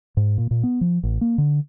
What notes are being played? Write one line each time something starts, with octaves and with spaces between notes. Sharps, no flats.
G#2
A#2
A#2
B3
F3
A1
A#3
D3